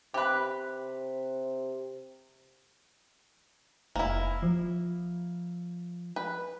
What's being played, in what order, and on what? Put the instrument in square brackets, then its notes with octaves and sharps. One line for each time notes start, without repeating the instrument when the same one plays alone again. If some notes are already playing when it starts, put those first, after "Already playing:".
[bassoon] C3 [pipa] G4 B4
[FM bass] F1 [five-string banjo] A#3 E4
[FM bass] F3
[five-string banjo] B4